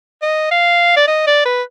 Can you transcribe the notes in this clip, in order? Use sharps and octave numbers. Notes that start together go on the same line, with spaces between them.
D#5
F5
D5
D#5
D5
B4